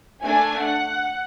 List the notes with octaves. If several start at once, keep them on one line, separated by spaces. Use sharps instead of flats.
A3 D4 G#5
F#5